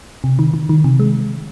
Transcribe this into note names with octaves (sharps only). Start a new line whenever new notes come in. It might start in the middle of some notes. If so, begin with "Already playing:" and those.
C3
D#3
D#3
D#3
C3
G#3